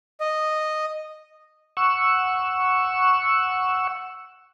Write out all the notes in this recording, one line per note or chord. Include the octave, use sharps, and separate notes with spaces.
D#5
F#5 C#6 E6